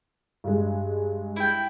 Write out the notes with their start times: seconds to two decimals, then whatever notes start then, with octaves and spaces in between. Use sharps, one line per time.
0.44 G2 G#3
1.36 E4 G5